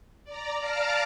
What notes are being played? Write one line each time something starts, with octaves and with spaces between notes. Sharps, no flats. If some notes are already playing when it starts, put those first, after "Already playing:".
D5 A#5
D5 F5 A5 A#5 D6 F6